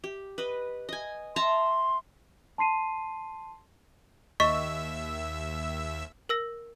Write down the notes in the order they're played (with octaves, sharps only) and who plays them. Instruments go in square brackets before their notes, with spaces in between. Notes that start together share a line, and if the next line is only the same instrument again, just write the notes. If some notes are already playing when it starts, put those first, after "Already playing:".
[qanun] G4
B4 D#5
D#5 G#5
[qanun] E5 A5 A#5 [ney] C6
[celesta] A5 C6 C7 D#7
[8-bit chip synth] D#2 E5 E6 [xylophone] D#5 C#6 B6
[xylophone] A#4 E6 A#6